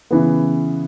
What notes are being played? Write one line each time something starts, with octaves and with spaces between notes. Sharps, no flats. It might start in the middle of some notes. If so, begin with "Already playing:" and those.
C#3 E3 B3